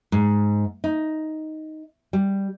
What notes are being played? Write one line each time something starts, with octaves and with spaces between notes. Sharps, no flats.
G#2
D#4
G3